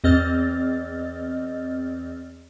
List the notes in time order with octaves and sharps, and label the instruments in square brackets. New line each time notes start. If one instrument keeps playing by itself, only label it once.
[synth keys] E2 C4 D#5 F6 A6